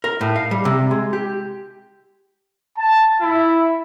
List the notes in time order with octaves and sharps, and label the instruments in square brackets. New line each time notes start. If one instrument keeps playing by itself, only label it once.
[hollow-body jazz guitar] A#4
A2
F5
G3
C3
G#3
G4
[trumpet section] A5
E4